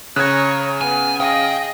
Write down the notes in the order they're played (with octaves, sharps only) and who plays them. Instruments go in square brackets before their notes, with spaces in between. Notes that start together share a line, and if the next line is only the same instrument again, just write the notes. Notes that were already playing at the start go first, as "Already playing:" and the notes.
[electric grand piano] C#3 G#6 [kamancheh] C#5 A#5 [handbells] F#6
[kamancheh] B3 [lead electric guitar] G#5
[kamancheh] G#4 D#5 [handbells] F5 D#6 [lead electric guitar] G5